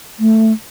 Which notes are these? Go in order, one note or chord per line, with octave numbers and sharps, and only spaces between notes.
A3